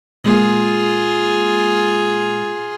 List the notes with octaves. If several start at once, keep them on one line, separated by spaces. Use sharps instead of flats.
A#2 G#3 A#3 F4 G#4